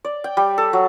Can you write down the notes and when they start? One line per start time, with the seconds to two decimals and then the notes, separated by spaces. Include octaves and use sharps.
0.04 D5
0.24 G5
0.37 G3
0.58 A4
0.73 F#3